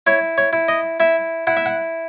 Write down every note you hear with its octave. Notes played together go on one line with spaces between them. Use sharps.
E4 C#5
C#5
E4
D#5
E4 E5
E4 F#5
E5
F#5